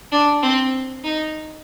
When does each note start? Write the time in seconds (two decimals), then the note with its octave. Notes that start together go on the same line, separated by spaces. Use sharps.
0.12 D4
0.42 C4
1.04 D#4